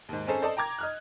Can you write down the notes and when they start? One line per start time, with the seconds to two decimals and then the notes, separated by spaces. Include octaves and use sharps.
0.09 D#2 G#2
0.27 C4 C#4 D#4 G#4 A4 C5
0.42 A4 C5 D5 D#5 A5
0.57 G5 A#5 D6 G#6
0.79 D#5 F6 F#6